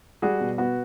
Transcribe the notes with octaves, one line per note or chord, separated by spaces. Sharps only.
G3 F#4 G#4
B2
B3 F#4